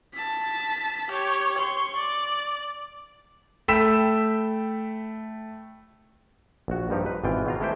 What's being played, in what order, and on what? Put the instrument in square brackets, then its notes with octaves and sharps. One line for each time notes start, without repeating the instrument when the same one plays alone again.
[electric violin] A5 B6
G4 C#5
C6 C#6
D5
[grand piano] A3 G5 B5 E6 B6 E7
[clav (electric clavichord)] A#1 F#4
G2 F3 D#4 G4
B4
G#1 B2 E3 F4 G5
B2 F4 A#5
G#3 A3 E4 G4 C5 G5